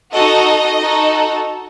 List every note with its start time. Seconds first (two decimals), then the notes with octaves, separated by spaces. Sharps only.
0.13 D#4 F#4 A4 D#5
0.80 D#4 F#4 A4